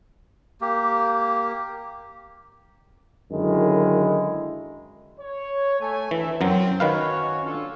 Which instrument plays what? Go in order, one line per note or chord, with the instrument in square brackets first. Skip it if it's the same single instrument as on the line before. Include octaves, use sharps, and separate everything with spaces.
[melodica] A#3 G4
[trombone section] F#2 D3 D#3 G#3 E4
[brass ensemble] C#5
A3 G#5
[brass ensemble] D2 E5 [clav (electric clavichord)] E3
[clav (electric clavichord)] F#2 F#3 [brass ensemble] C4
[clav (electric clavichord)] D#3 B4 F5 [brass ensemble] C#4 F#4 C#5
[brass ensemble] D4 F4 A4